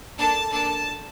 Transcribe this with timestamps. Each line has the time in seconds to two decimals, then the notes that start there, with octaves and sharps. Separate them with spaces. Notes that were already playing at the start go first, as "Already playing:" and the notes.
0.18 A#3 D4 A4 A5
0.51 A#3 D4 A4 A5